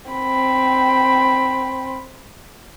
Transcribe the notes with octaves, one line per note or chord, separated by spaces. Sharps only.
C4 B5